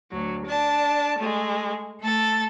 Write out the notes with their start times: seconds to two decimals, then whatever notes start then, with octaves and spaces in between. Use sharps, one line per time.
0.11 D2 F#3
0.45 D4 A5
1.17 G#3 A3
2.01 A3 A4 A6